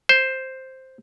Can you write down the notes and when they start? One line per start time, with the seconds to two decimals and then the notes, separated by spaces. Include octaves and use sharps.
0.09 C5